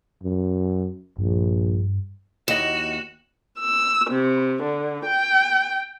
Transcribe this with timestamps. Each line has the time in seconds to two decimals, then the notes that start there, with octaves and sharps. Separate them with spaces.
0.23 F#2
1.18 A#1 G2
2.48 D#2 E4 F#4 D#5 E7 F#7
3.60 E6
4.10 C3
4.62 D3
5.04 G5